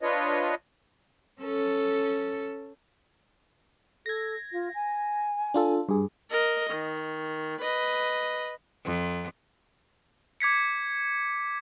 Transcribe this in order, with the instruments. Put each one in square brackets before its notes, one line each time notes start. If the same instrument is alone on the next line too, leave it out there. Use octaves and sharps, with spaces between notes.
[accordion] D4 F4 B4 C#5 D#5
[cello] C#4 A4
[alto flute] A4 [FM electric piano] G#6 A#6
[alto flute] F4
G#5
[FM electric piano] D4 F4 A4
G2 G#4
[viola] A#4 D#5
D#3
B4 D#5
[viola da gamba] F2
[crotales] D6 G#6 B6 C#7